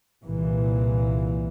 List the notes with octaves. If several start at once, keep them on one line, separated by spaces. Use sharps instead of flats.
C2 A#2 E3